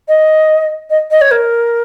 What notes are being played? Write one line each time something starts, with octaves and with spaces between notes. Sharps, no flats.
D#5
D#5
D#5
C#5
A#4